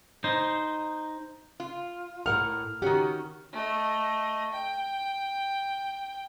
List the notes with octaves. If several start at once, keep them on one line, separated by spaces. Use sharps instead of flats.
D#4 C5
F4
A2 A#4 F#5 F6
D#3 C#4 F#4 G4
A3 D#5
G5